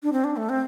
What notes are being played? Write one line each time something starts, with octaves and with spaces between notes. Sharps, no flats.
D4
C4
D4
A3
C4